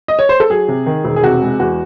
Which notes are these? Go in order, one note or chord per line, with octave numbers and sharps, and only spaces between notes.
D#5
C#5
C5
A4
F#3 G#4
C3
D#3
E1
G#4
C3 F#4
G#3
E2 F#4